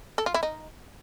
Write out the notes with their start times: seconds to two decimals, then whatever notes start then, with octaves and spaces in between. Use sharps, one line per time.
0.18 A4
0.26 F4
0.34 E4
0.43 D#4